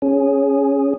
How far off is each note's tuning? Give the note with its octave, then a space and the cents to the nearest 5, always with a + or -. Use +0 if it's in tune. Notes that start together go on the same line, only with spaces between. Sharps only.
C#4 +0 G#4 +0